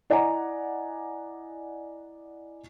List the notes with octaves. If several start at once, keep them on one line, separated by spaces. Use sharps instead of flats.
E4 D5 D#5 F#5 G#5 A#5